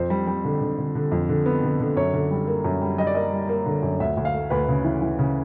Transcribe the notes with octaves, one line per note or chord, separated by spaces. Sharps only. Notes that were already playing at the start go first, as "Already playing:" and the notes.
Already playing: F2 C5
G3
G3
D3
D3
D3
D3
F2
D3
B3
D3
D3
F#2 C#5
D3
G3
A#3
F#2
G3
G3 D#5
D5
A#3 D#5
G3
A#3
D3
F#2
D2 E5
D2
F5
A3
D2 B4
C#3
E3
E3
C#3